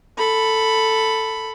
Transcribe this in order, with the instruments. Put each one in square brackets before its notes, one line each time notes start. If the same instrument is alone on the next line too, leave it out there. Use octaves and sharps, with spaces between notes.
[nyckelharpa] A4 B5